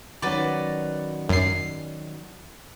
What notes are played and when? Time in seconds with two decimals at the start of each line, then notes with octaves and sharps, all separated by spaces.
0.22 D#3 F#3 C#4 F#4 B4 D5
1.29 F#2 C7